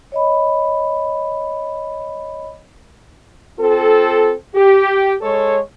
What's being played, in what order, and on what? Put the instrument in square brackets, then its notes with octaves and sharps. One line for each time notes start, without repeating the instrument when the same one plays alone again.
[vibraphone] C#5 D#5 B5
[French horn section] C4 F4 A4
G4
G#3 A4 C#5